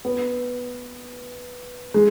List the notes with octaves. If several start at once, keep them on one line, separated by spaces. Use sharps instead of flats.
B3
G#3